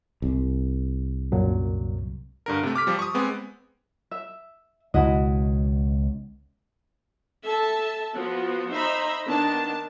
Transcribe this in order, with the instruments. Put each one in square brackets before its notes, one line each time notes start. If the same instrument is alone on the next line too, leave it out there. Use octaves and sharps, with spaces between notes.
[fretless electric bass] C2
[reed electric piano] F#2 A#2 F#3
[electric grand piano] G2 D3 A#4
C3 A3
D6 F6 B6
F3 G3
C#6 D#6
G#3 B3 C4
[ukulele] E5
[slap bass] C#2 B2 [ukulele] E4 F#4 D#5
[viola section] A4 E5 A5
F3 B3 F#4
D#4 C5 E5 A#5 B5
D#3 B3 D4 A5